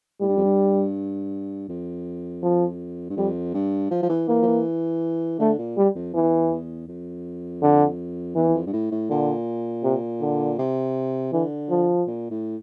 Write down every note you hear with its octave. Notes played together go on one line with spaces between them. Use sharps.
A2 G3
G2
F2
G2
F2
F3
G2
F2 G3
G2
F3
F3
E3
E3 A#3
F3
E3
D3 A3
A#2
G3
F2
E2 E3
E2
F2
D3
E2 E3
E2
F2
G2
A2
A2
A#2 D3
C3
D3
C3
D3 E3
F3
A#2
A2